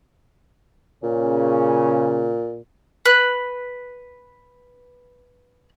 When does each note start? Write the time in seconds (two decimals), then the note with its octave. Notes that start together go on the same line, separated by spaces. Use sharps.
1.03 A#2 C#3 C#4
3.05 B4 F#6